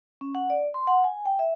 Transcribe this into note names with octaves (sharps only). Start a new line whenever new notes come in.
C#4
F#5
D5
C6
F#5
G#5
G5
E5